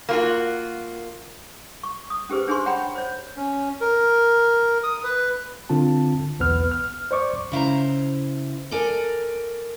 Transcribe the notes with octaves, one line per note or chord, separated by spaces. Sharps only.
A#3 F4 F#4
C#6
D#6
C#4 G4 G#4 B4 C5
D4 G#4 C5 G#5 C6 C#6
C#5 F#5 G5 A#5 B5
C5 C#5
C#4
A#4
D#6
B4
D3 C4 F4 A5
B1 E2 B3 B4 F6
F6
C5 D5 C#6 D6
C#3 E4 C5 A#5
A4 A#4 D5 G#5